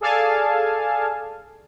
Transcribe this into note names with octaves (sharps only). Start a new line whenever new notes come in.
G#4 A4 D5 F5 G#5 A5